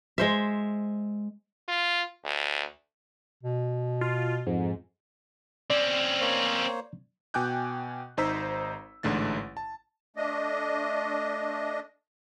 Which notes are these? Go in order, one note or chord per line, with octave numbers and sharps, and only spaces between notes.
G#3 C5 E5
F4
D2
B2
F4
F2 G#2
C4 C#4 D5
A#3 C5 C#5
B2 G5 G#5 D6 F#6 G6
G#1 D#4 C5 A#5 E6 B6
A1 G#2 D3 A3 A6
A5
A3 D4 D#5